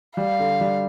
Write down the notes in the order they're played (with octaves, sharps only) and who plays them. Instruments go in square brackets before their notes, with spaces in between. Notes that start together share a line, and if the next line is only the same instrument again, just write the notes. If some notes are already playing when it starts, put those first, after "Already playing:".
[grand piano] G3 [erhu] F5
[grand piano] D3
G3